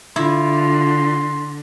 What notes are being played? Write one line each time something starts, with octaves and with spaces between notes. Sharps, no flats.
D3 E4 F4 C6